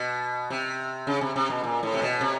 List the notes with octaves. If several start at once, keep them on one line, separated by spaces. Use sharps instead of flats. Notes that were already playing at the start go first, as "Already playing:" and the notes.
Already playing: B2
C3
C#3
C3
C3
B2
A#2
A2
C3
B2
C3